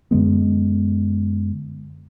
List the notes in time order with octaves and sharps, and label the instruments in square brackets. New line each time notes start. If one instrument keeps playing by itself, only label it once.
[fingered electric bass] F#2 D3 G#3 B3